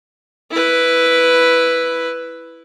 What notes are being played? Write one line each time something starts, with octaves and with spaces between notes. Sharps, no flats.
E4 B4